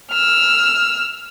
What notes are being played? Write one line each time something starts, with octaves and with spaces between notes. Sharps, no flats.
E6 F6